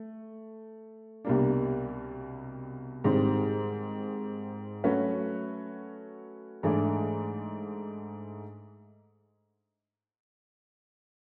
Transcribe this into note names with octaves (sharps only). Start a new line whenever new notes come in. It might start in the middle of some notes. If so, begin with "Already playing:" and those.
Already playing: A3
C2 B2 G3 A#3 D4
G#2 D#3 G3 C4
F#3 A3 C#4 F#4 B4
G#2 E3 A3 D4